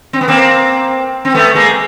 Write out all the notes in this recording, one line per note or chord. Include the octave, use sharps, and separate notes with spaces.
C4
B3
A#3 C4
C4
A3 B3
G#3 A#3